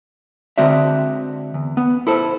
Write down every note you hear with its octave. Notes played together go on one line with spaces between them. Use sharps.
D3 G#3 C4 F#4 D5 E5
E2
B3
E4 A4 C5